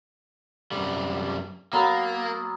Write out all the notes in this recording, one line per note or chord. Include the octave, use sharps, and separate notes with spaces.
F#2 C3 G3
F#3 A#3 B3 A#4